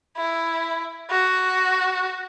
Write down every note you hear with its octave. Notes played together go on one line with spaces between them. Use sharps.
E4
F#4